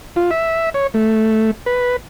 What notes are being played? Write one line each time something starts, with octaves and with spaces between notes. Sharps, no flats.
F4
E5
C#5
A3
B4